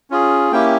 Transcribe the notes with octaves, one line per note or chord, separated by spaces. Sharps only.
C#4 F4 G#4
A#3 C#4 E4 G4 G5